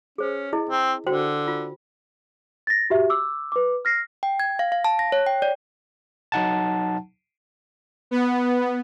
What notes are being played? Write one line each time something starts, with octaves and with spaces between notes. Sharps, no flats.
C#4 G#4 C5
E4 G#4 D#5
C4
D3 F#4 C5 G5
F4
A6 A#6
F#4 G4 E5
D6 E6
B4 D6
F6 A#6 C7
G5
G#6
F5
F5
A5
A#6
C#5
G5
D5
F#3 D#4 F#5 A5
B3